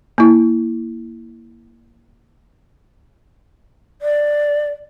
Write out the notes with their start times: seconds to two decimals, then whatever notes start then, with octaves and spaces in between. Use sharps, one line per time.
0.18 A#3 E4
4.02 D5